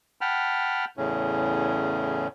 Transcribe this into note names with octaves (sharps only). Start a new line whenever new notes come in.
F#5 G5 A5 B5 F6
E2 A2 C#3 C#4